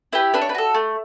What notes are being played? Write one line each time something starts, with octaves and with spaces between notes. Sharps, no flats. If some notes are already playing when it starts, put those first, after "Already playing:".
E4 G4 B4
D4 B4
C#5
B4
F#4 A4
A3